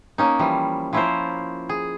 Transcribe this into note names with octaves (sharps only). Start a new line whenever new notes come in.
A#3 C#4 D#4
E3 F3 G3
F3 C#4 E4 F4 A#4 C5
G#4